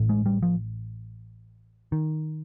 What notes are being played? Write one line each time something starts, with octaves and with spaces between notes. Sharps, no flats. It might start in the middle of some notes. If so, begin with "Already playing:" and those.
Already playing: A1 A2
G#3
G3
F3
D#3